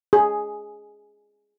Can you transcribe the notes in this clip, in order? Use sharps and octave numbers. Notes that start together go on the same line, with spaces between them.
G#4